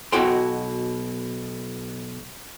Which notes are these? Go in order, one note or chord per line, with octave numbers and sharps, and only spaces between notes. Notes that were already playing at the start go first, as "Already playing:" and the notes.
B1 B2 E4 F#4 G5 C6